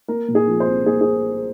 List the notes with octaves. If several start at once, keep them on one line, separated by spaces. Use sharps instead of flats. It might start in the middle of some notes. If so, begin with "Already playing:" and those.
A#3 A#4
A#2
G#4
F3
C5
C2
A#3 G#4
G#4